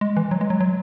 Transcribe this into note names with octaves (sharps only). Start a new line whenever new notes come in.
G#3
E3
F#3
G#3
F#3
F#3